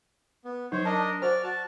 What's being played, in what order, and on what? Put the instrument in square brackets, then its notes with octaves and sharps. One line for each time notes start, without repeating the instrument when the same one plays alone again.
[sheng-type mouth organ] B3
[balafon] F#3 D#4 [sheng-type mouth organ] C5 C#5
[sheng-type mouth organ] D4 A#4 D#5 [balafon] A5
[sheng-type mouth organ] F#4 D5 F6 [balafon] C5
[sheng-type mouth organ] F#4 A5